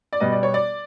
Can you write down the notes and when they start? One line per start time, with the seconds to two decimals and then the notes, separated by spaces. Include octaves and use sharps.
0.13 D5
0.20 B2 G3 B3 D#5
0.32 D5
0.43 C#5
0.54 D5